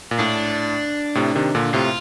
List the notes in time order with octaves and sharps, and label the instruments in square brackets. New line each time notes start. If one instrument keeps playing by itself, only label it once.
[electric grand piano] A#2
[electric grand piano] A2 [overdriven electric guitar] D4
[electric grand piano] A2 C3
C3 D#3
A#2 D3
[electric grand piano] A2 C3 [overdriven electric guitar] F4